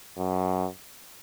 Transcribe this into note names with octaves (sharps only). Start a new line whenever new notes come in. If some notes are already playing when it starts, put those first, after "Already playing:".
F#2